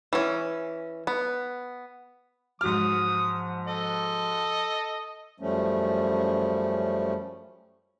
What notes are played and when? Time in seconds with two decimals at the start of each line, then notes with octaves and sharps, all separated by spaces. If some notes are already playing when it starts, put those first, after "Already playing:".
0.13 E3 C#4
1.07 B3
2.61 G#2 F3 F#3 D#6 F6
3.67 A4 D#5
5.40 F#2 F3 G3 A3 C#4